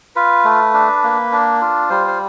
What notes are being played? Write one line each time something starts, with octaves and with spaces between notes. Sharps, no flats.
F4 B4
A3
D4
A#3
D4
F4
G3 C5
C5